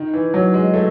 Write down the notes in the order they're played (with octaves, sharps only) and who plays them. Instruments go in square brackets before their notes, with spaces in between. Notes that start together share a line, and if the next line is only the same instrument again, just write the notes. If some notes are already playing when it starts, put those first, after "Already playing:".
Already playing: [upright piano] D#3
E3
F#3
G#3
A3